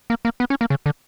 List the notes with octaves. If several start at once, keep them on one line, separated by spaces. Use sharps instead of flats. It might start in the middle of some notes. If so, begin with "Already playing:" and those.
A#3
A#3
B3
C#4
A#3
C#3
D3